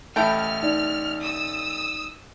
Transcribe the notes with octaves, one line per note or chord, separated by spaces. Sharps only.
A1 A3 E4 A4 G5 F6
D#4 D5
D#6 E6